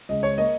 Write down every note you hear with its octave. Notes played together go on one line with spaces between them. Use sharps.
C#2 D#5
C#2 C#5
A#3 D#5